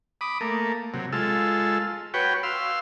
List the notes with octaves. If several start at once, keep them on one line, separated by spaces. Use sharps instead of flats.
B5 D6 D#6
A3 A#3
C3 F#3
G#3 F4 A4 E6
F#4 B4 C#5 G5
F5 C6 E6